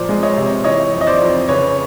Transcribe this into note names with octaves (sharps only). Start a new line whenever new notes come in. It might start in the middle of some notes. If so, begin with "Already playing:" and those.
Already playing: A#2 F3 C5 D5
G#3
C#5 D#5
C3
E3 C#5 D#5
F2
D#5
C5 D5
F2
C#3 B4 C#5